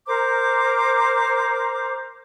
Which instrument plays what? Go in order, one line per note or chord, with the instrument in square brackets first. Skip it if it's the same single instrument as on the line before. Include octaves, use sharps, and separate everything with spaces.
[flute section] A#4 C5 A#5 D6